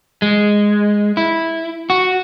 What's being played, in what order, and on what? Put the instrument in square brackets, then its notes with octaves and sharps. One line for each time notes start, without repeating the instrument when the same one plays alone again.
[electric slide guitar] G#3
E4
F#4